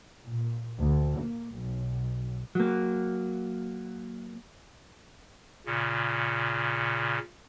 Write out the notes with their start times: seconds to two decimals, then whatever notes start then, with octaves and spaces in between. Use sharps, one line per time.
0.27 A#2
0.82 D2
1.23 A#3
1.57 B1
2.55 F#3 A#3
5.66 A#2 C#3